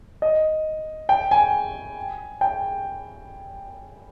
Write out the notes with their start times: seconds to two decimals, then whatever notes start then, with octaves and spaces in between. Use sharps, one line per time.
0.22 D#5
1.09 G5
1.31 G#5
2.41 G5